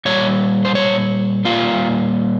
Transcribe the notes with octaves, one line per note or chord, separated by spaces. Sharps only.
A#2 G3 C#5
C5
C#5
A#2 G3 A#3 F4